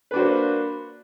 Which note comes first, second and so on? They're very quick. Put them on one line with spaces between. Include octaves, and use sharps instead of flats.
B4 D4 F#4 C5 A#3